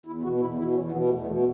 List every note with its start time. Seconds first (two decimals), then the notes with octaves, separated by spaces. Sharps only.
0.06 E2 E4
0.23 B2 F#4
0.40 E2 E4
0.58 B2 E4
0.75 E2 C#4
0.92 B2 B3
1.04 G3
1.10 E2 A3
1.26 B2 A3